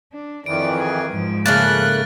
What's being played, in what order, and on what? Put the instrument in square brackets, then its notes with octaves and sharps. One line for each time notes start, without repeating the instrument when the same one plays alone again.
[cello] D4
[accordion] F2 D#3 E3 [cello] D5 [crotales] D7
[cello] G#4
G#2 F3
[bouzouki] C#3 A3 A#3 [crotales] F6 A6 [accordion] F#6